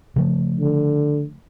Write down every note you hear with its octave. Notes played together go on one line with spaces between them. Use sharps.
C#3 F3 A3
D3